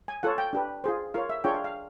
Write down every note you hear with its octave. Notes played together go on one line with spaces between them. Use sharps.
G#5
F4 A4 C#5 F#5
G5
D4 G4 B4
F4 G#4 C5
F4 A#4 C#5 F5
E5
D4 F4 G#4 C#5 G5
F5
F5